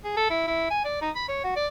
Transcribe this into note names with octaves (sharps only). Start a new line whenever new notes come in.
G#4
A4
E4
E4
G#5
D5
D#4
B5
C#5
F#4
D5